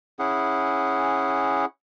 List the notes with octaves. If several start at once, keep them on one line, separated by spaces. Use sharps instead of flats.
C#4 E4 G#4 F#5